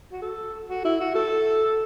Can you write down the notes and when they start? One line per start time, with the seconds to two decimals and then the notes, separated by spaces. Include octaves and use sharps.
0.12 F#4
0.22 A4
0.69 F#4
0.85 E4
1.00 F#4
1.15 A4